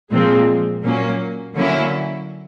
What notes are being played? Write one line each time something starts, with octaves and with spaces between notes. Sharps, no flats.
A#2 F3 G#3 C4
A#2 F#3 A#3 C#4
D3 F#3 A#3 C#4 E4